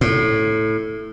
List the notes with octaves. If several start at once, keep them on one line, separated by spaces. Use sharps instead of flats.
A2